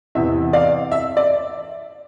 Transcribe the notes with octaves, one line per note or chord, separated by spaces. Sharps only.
E2 C3 E3 E5
D5 F5
E5
D5